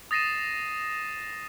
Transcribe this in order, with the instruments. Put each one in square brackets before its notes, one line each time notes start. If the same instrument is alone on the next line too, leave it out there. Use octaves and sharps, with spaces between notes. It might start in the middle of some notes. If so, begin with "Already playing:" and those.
[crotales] D#6 A6 A#6 C7 D#7 E7